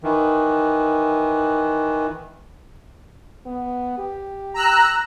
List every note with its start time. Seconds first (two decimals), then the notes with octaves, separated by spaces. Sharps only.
0.03 D#3 E3
3.46 B3
3.98 G4
4.54 A#5 E6 F#6